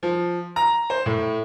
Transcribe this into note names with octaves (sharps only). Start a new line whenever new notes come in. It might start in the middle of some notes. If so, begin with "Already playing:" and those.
F3
A#5
C5
A2